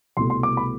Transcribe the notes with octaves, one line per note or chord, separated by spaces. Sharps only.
C2 B2 A3 C6
C6
D6
B5